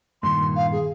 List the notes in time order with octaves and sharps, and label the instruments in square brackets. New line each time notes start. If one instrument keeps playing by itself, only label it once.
[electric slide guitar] G2 A#2 D#3 [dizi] C6
[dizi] F5
G#4